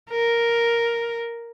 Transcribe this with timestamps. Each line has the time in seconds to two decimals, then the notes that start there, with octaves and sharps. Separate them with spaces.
0.10 A#4